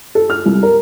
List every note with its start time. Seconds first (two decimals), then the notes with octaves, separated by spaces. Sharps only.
0.15 A4
0.30 F6
0.46 C2
0.63 A#4